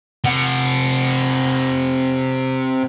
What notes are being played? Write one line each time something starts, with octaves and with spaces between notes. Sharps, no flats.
C3 F#5